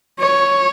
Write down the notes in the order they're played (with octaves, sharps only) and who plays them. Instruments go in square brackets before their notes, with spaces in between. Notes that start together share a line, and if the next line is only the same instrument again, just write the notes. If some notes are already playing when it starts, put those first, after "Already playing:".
[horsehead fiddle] C#5